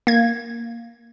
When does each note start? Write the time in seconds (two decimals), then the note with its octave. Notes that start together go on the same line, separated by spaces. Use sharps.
0.07 A#3 G#6